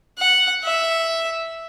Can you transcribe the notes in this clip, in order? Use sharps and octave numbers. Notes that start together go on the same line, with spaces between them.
F#5
E5